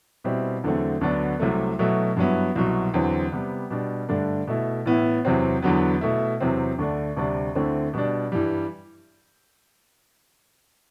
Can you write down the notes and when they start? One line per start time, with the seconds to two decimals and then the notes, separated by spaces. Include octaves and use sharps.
0.24 B2 G3 C4 E4
0.63 E2 D3 F#3 A3 C4
1.01 D2 D3 F#3 B3 D4
1.39 C2 C3 F#3 A3
1.79 B2 F#3 A3 E4
2.16 G2 F#3 B3 E4
2.56 C2 B2 F#3
2.94 E2 D3 F#3 C4
3.32 C3 G3 B3
3.70 B2 G3 D4
4.09 G2 D3 A3 D4
4.47 B2 A3 E4
4.85 A2 E3 B3 E4
5.25 E2 C3 F#3 C4
5.62 E2 D3 F#3 B3
6.01 B2 A3 E4
6.40 E2 C3 F#3 C4
6.79 D2 D3 A3 D4
7.17 D2 C3 G3 D4
7.55 D2 D3 A3 C4 E4
7.93 B2 G3 D4
8.32 G2 E3 G3